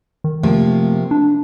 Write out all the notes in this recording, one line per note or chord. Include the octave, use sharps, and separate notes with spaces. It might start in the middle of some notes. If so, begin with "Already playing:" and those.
D#3
C3 F3 A3 A#3
D4